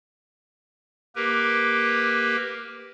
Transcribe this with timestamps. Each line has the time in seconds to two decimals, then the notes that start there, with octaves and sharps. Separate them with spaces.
1.15 A#3 G4 A#4 B4